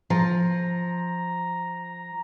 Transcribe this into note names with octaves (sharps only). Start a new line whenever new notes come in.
F3 A#5